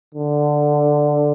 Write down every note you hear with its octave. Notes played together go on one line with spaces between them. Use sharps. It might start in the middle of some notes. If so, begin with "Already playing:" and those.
D3